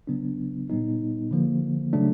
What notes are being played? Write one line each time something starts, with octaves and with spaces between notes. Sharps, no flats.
C#3 F#3 B3 D4
A#2 G3 B3 D#4
D3 F3 A#3
C#3 F#3 A3 D4